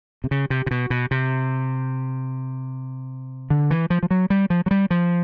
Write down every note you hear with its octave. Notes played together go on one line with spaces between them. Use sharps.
C3
C#3
C3
C3
B2
B2
C3
D3
E3
F3
F3
F#3
G3
F3
F#3
G3
F3